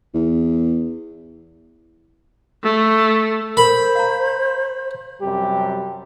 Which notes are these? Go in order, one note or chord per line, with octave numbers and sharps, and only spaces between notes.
E2
A3
A#4 C5 B5
F5 A#5
F#2 C3 G3 G4